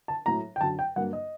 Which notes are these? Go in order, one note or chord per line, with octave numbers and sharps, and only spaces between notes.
A5
A2 F#3 A3 A#5
G5
F#2 D3 F#3 A5
G5
G2 F#3 A#3 F#5
D#5